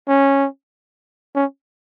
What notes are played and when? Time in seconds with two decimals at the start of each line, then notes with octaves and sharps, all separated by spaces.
0.08 C#4
1.35 C#4